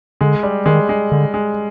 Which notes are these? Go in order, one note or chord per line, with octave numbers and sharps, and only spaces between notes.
D3 G#3
G3
D#3 G#3
G#3
D3
G#3